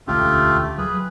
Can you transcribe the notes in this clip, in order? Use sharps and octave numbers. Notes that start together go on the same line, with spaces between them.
E1 D2 A3 C#4 F4 G4
F#3 G#4 B4